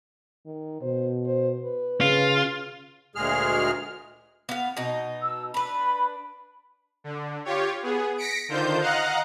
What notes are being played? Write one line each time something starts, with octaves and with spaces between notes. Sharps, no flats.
D#3
B2 C5
C5
B4
C#3 F4
D2 A#2 G#3 G#4 F6
B3 F5
B2 D#4
E6
D4 B4 B5
D3
F4 G4 C#5
B3 G#4
A#6 B6 C#7 D7
D3 D#3 F4 C5 G6
D#5 F5 F#5 A#5 F#6